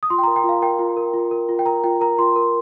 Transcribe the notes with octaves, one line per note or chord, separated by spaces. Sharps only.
D#6
F4 C6
G5
A#4 A#5
G5
F4 F5
A#4 G5
F4
A#4
F4
A#4
F4
G5
A#4 A#5
F4 G5
A#4 A#5
F4 C6
A#4